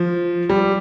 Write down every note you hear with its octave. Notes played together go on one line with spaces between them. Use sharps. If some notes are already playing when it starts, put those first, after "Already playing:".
Already playing: F3
G3